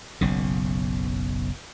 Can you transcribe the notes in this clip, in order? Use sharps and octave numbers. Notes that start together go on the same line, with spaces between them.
F#1 B1 C#3